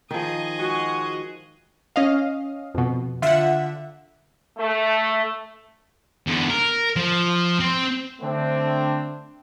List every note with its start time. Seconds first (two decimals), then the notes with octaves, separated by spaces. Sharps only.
0.11 D#3 F3 G#4 D#5
0.59 G#3 F#4
1.96 C#4 D#5 F5
2.74 F2 B2
3.22 D3 F4 E5 F#5
4.58 A3
6.27 E2 D3
6.50 A#4
6.96 F3
7.60 C4 C5
8.22 D3 A3 C4 D4